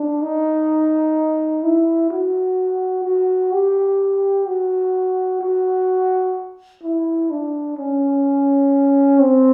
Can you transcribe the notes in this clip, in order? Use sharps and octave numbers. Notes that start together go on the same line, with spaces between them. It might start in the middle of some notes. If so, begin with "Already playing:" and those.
Already playing: D4
D#4
E4
F#4
F#4
G4
F#4
F#4
E4
D4
C#4
C4